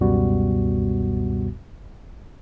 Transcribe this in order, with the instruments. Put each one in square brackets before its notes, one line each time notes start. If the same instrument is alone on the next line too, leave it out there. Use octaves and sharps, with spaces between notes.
[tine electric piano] C#2 F#2 B2 G3 B3 F#4